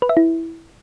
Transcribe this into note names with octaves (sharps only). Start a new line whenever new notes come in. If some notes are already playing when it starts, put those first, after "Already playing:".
B4
E5
E4